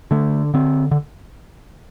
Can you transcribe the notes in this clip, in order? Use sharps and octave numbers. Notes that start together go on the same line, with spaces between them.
D3 A3
D3 C4
D3